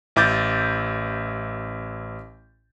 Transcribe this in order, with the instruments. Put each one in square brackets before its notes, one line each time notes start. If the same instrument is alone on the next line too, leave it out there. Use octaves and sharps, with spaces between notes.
[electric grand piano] A1 E4 D6 G6 A6